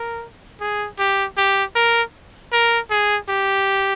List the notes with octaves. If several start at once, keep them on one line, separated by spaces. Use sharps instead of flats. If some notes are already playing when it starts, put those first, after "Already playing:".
Already playing: A#4
G#4
G4
G4
A#4
A#4
G#4
G4